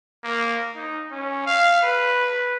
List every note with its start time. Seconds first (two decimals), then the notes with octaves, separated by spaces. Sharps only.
0.24 A#3
0.76 D#4
1.11 C#4
1.46 F5
1.82 B4